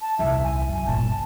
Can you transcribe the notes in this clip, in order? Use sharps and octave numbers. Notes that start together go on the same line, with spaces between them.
A5
D#1 C2 E5
G#5
F#2
G1 A#2 A5